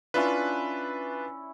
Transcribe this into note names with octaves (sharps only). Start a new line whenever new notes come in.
C#4 D4 E4 F4 B4 D5